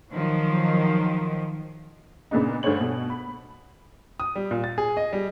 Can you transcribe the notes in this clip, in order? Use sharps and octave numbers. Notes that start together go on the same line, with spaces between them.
D#3 F3 F#3
A#2 C#3 B3 D4 D#4
D2 G2 A3 C5 C#5 F#7
B2
B5
D#6
G3
A#2
A6
G#4
D#5
G3